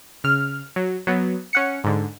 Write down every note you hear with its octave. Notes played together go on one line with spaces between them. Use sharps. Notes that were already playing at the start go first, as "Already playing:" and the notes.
C#3 F6
F#3
F#3 B3
C#4 F#5 C#7
G#2 D3